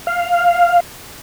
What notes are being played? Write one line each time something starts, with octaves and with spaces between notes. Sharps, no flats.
F5